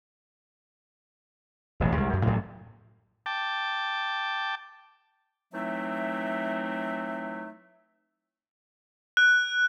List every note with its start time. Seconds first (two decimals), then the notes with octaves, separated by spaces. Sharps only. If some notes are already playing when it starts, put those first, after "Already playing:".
1.80 E1 A1
1.97 C2 G#3
2.13 F#2
2.25 A1 A2 F#3 A3
3.26 G5 A5 D6
5.53 E3 F#3 A3 C4 D#4 E5
9.17 F#6